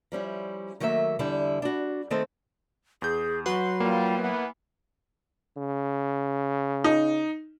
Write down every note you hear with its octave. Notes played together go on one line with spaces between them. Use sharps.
F3 G3 C#4 E4
D#3 F#3 A3 A#3 D#5 E5
E2 D3 G3 E4
D4 F#4
D#3 A3 C4 A4 C5 D#5
E2 G#4 G6
F#3 F#4 B4 C6
G3 A#3 F4
E3 B3
C#3
D#4